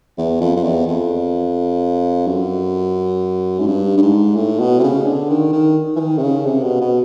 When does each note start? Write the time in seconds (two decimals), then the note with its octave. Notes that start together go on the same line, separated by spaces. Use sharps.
0.18 E2
0.40 F2
0.56 F2
0.63 E2
0.87 F2
2.27 F#2
3.59 G#2
3.67 G2
3.97 G2
4.02 G#2
4.36 A2
4.60 B2
4.79 C3
4.83 C#3
5.06 D3
5.30 D#3
5.52 D#3
5.96 E3
6.00 D#3
6.18 C3
6.22 C#3
6.46 C3
6.63 B2
6.81 B2